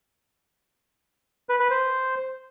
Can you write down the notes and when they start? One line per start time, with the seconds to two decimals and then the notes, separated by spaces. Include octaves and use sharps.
1.49 B4
1.60 B4
1.70 C5